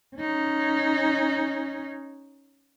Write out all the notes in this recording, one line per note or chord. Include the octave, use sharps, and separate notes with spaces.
C#4 D#4